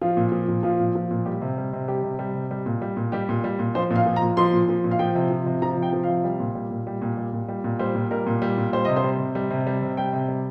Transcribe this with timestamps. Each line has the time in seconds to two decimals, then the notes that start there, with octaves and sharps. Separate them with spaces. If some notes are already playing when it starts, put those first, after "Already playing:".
0.01 F3 F4
0.17 A#2
0.32 F3
0.48 A#2
0.63 F3 F4
0.80 A#2
0.95 F3
1.11 A#2
1.26 G3 G4
1.42 C3
1.58 G3
1.73 C3
1.88 G3 G4
2.03 C3
2.19 G3
2.34 C3
2.51 G3
2.66 A#2
2.82 G3
2.97 A#2
3.12 G3 G4
3.29 A#2
3.44 G3
3.59 A#2
3.75 F3 C5
3.90 A#2
3.96 F5
4.06 F3
4.16 A#5
4.22 A#2
4.37 F3 C6
4.53 A#2
4.69 F3
4.84 A#2
4.91 F5
4.99 F3 G5
5.15 C3
5.31 F3
5.46 C3
5.62 F3 A#5
5.77 C3
5.82 G5
5.93 F3
6.04 C3 F5
6.24 G3
6.40 A#2
6.55 G3
6.71 A#2
6.87 G3
7.02 A#2
7.17 G3
7.33 A#2
7.48 G3
7.64 A#2
7.79 G3 C5
7.95 A#2
8.11 G3 A#4
8.27 A#2
8.42 G3
8.58 A#2
8.73 G3 C5
8.85 C3 D#5
8.96 C5
9.04 G3
9.20 C3
9.35 G3
9.51 C3
9.67 G3
9.82 C3
9.97 G3 G5
10.13 C3
10.28 G3